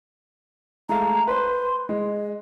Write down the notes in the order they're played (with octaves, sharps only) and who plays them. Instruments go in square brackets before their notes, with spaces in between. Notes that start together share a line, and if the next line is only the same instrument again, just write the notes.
[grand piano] G#3 A3 F5 [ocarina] A#5
[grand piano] B4 C5 [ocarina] C6
[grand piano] G#3 [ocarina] D#5